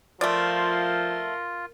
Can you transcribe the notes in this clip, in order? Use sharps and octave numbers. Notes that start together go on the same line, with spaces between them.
F3 A3 F4 A#4 D5 C6